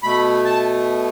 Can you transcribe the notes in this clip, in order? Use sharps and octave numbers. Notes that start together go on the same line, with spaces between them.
B2 A3 B5
A5